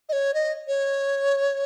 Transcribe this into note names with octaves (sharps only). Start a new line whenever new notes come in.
D#5
C#5
D#5
C#5